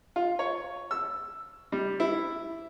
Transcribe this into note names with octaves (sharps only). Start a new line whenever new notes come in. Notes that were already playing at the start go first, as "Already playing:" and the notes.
F4
C#5
E6
G3
E4